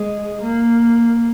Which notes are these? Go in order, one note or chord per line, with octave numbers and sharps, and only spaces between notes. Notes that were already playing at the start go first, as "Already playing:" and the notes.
Already playing: G#3
A#3